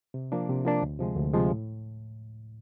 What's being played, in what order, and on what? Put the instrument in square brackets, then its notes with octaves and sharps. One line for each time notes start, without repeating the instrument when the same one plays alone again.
[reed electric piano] C3
F3 A#3 D4
C3
F3 A#3 D4
D2
C3 F3 G#3
D2
C3 F3 G#3
A2